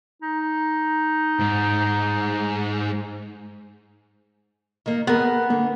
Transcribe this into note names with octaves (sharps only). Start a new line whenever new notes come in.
D#4
G#2
D#3 A#3
B3 G#4 A#4
D3 A#3